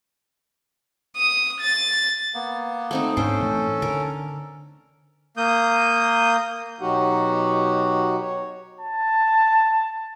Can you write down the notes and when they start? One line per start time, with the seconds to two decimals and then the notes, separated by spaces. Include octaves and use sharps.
1.16 D#6
1.61 A6
2.34 A#3 B3
2.91 A3 C4 D#4
3.17 G#2 C#4 D4 A4 C5 G5
3.40 A2 E3 A3
3.82 D3 A#4
5.37 A#3 D#6 G6
6.80 B2 F#3 D#4 F#4 G4 F#5
8.21 C#5
8.80 A5